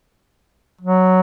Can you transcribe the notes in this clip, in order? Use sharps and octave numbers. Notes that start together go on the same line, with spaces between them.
F#3